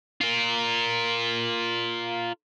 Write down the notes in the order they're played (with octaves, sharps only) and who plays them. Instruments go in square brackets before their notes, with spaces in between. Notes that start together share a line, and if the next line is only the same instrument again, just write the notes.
[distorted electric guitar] F4 A#4